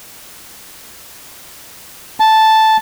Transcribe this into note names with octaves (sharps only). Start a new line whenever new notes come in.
A5